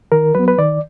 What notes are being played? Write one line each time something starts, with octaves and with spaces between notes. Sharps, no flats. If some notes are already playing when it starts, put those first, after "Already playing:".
D#3 A#4
F#3 B3 B4
B4
D#3 D5